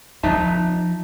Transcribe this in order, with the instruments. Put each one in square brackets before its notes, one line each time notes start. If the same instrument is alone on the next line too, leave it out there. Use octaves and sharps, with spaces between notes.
[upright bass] F3 [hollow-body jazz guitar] D#4 E5 A5